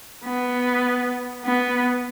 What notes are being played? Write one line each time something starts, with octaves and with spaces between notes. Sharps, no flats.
B3
B3